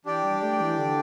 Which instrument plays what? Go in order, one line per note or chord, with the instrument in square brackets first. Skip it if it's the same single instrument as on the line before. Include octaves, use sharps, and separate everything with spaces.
[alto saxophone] E3 [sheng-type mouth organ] D4 G4 D5 G5
[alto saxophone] G3
A3
E3
D3